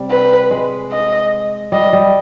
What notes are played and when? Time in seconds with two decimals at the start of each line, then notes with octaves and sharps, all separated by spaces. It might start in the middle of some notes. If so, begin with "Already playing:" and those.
Already playing: C3 G3
0.11 B4
0.51 G#3
0.92 D#5
1.72 G3 D#5
1.93 G3